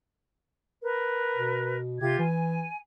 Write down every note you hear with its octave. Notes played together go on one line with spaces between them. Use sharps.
A#4 B4
B2
C3 F4 G4 G#6
E3 G#5